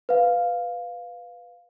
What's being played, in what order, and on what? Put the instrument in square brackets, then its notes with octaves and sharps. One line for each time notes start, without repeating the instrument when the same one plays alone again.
[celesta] B4 F5